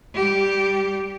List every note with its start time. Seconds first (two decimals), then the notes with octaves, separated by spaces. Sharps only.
0.14 G3 G4